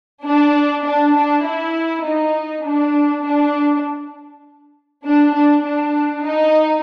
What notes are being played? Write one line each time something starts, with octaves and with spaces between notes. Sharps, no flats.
D4
D4
D4
E4
D#4
D4
D4
D4
D4
D4
D#4